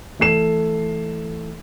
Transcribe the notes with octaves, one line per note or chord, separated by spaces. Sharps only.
E3 A3 A4 C7 E7